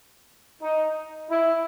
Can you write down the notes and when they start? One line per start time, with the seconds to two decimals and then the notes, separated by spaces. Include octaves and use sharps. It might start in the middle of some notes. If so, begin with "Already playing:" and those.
0.62 D#4
1.30 E4